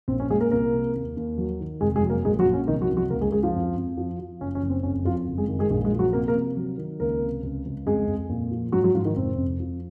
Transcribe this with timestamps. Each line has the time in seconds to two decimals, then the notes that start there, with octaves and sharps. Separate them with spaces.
0.08 A#1 C4
0.20 C#4
0.30 A#2 G#3 G#4
0.40 A#3 A#4
0.51 C2 A#3 A#4
0.73 C3
0.95 D#2
1.17 D#2
1.38 F#3
1.60 D#3
1.81 F1 G#3 G#4
1.96 G#3 G#4
2.03 F#3
2.09 A#3 A#4
2.25 A#1 G#3 G#4
2.39 F#3 F#4
2.45 A#1
2.54 C#4
2.67 C2 D#3 D#4
2.82 F#3 F#4
2.90 C2
2.97 F#3 F#4
3.10 C#2 A#3 A#4
3.21 G#3 G#4
3.32 C#2 G#3 G#4
3.43 F3 F4
3.54 F2
3.76 F2
3.97 F3
4.19 F3
4.41 F#1 C#4
4.55 C#4
4.62 F#1
4.69 C4
4.83 F2 C#4
5.05 F2 F3 F4
5.28 F#1
5.38 G#3 G#4
5.48 D#3
5.59 G#3 G#4
5.70 A#1 G#3 G#4
5.85 G#3 G#4
5.93 F3
5.99 F#3 F#4
6.13 C3 A#3 A#4
6.28 A#3 A#4
6.35 C3
6.57 F#3
6.78 D#3
7.00 C#2 A#3 A#4
7.22 C3
7.43 C#2
7.65 C#2
7.86 F2 G#3 G#4
8.08 F2
8.30 A#2
8.51 F3
8.72 G#2 F#3 F#4
8.84 F#3 F#4
8.95 G#2 F3 F4
9.05 D#3 D#4
9.16 F1 C4
9.38 F2
9.60 F3